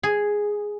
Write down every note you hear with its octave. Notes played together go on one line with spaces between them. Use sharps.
G#4